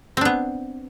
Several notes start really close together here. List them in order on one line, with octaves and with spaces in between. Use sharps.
C4 D4 B3